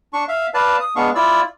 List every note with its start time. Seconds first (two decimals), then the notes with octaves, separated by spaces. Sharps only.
0.13 D4 C#6
0.28 E5 F5
0.54 B4 D5 F5 A5
0.80 D#6
0.96 G#3 B3 D4 F5 C#6
1.15 E4 F4 D5 E6